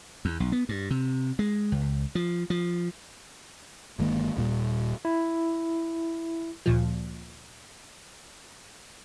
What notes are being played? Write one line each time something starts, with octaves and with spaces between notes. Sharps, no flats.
E2
B1
B3
G2
C3
G#3
C#2
F3
F3
G1 D#3 G#3 A#3
D#1 A#2 G3
E4
D2 A#2 F3